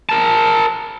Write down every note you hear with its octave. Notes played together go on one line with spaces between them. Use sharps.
A#4 A5